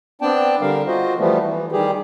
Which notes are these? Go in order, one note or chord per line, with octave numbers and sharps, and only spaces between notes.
B3 C4 D4 D5 G5 A5
D3 G3 A#4 F5
F4 F#4 C5 D#5
E3 F3 G3 A3 B3
E3
D#3 G3 G4 G#4